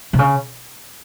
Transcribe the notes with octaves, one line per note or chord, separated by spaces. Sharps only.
C3
C#3